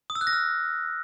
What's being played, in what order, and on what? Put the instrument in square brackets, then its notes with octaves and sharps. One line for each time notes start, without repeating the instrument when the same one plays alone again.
[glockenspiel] D#6
E6
F#6
A#6
F6